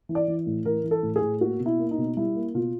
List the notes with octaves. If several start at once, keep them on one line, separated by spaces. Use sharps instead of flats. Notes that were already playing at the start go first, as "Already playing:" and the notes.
E3
D5
E3
A2
E3 A#4
E3
A4
A2
G#4
A2
A#3 F#4
B2
E4
A#3
D#4
B2
G3 E4
A#3
B2 F4